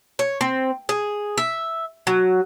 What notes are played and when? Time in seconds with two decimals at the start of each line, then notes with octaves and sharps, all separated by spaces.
0.19 C#5
0.41 C4
0.89 G#4
1.38 E5
2.07 F#3